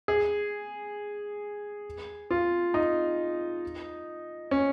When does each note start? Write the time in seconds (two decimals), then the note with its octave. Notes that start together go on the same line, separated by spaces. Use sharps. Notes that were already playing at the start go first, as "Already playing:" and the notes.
0.08 G#4
2.31 F4
2.74 D#4
4.51 C#4